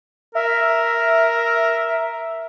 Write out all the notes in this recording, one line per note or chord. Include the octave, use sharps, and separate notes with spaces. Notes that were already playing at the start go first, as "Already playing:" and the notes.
A#4 E5